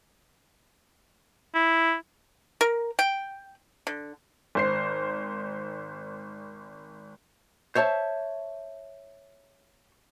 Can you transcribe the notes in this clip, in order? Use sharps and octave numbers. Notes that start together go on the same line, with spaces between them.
E4
A#4
G5
D3
G#1 C5 C7
C5 C#5 E5 A5